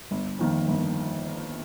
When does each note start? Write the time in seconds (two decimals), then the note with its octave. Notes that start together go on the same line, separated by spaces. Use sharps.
0.11 G1
0.39 F2 D#3 A#3
0.68 G1